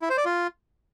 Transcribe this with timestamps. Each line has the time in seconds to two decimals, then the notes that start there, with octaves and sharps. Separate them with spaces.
0.02 E4
0.10 C5
0.17 D5
0.25 F4